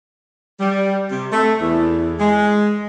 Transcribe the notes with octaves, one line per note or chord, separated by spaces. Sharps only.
G3
C3
A3
E2
G#3